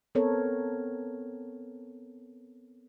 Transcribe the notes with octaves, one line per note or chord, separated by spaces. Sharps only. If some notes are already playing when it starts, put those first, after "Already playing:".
B3 C4 A4 A#4 C#5